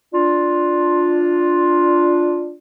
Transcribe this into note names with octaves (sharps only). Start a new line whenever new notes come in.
D4 F4